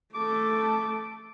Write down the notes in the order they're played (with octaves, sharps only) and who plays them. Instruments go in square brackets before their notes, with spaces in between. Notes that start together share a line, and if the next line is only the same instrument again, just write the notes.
[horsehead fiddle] A3 A4 [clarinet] D6